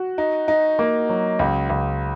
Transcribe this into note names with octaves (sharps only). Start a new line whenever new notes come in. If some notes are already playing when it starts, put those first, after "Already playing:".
Already playing: F#4
D#4
D#4
A#3
F#3
C#2
C#2